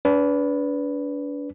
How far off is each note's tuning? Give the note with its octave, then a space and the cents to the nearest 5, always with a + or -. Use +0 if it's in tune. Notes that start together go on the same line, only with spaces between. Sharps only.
D4 -35 B4 +0